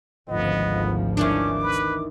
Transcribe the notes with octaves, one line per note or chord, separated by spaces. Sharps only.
G#1 D2 F3 B3 D#5
D#3 E3 C#4 D4 D6
B4